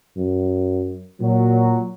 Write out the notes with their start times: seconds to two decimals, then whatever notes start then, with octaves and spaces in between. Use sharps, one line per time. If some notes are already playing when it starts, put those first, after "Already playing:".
0.17 F#2
1.21 A#2 F#3